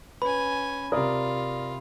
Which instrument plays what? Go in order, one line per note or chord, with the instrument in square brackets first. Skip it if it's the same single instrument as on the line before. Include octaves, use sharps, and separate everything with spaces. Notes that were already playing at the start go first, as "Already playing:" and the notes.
[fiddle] C#4 G#5 [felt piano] B4 [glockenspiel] B5
[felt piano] C3 D#6 [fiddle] F4 [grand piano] A#4 D5